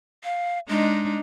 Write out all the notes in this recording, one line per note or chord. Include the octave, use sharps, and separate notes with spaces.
F5
G#3 D4 D#4